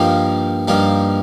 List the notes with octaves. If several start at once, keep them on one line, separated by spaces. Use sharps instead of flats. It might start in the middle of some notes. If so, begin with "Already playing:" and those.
Already playing: G2 F3 A#3 D#4
G2 F3 A#3 D#4